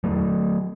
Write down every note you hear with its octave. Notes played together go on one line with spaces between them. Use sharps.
E2 F#3 A3